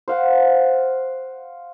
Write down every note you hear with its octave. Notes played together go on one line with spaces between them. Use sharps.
C5 F5 F#5